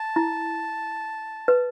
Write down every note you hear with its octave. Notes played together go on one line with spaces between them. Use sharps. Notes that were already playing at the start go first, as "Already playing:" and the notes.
Already playing: A5
E4
B4